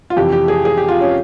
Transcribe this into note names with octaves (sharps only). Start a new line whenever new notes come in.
F4
F2 C3 E3 G4
G4
G#4
G#4
G4
F4
C#4